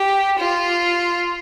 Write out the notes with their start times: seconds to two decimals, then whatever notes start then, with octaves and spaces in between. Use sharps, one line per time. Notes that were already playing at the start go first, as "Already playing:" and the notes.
Already playing: G4
0.39 F4